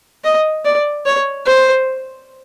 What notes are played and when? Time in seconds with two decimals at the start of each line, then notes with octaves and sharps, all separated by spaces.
0.24 D#5
0.65 D5
1.06 C#5
1.46 C5